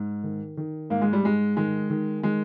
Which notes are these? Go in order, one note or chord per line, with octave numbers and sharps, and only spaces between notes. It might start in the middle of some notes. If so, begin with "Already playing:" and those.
Already playing: G#2
D#3
D#3
G#2 A#3
G#3
G3
G#2 G#3
D#3 G#3
D#3
D#3 G#3